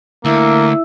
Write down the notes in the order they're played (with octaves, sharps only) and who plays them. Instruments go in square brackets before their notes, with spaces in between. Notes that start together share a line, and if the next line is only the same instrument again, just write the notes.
[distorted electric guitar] D2 [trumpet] A#3 [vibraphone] E4 E5 E6